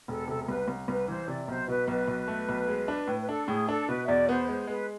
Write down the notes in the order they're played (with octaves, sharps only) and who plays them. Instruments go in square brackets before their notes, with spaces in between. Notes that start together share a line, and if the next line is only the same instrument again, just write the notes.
[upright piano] E1 [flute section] A4
[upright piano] C3 [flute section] A4
[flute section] A4
[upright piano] C2 [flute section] B4
[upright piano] C2
[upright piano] C2 [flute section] B4
[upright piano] E3 [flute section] C5
[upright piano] C3 [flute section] D5
[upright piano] B1 [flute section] C5
[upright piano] B2 [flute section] B4
[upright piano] B1 [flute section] B4
[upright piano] B1
A3
B1
G#3
D4
A2
[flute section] B4
[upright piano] D4 [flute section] A4
[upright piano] A2 [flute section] G#4
[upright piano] D4 [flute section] A4
[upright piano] B2 [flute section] B4
[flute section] E5
[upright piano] E2 [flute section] D5
[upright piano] B3 [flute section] C5
[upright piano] G#3 [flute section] C5
[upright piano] G#3 [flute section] B4